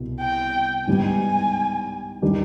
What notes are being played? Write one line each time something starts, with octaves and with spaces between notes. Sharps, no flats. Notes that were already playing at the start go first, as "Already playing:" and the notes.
Already playing: C2 B2 B3
G5
G#2 G3 B3 D#4 G#5
D#3 G3 D4 G4